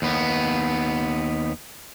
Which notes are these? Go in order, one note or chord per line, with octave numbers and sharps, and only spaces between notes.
D#2 B3